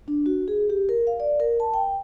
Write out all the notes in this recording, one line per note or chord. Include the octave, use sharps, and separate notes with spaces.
D4
F#4
G#4
G4
A#4
F5
D5
A#4
A5
G5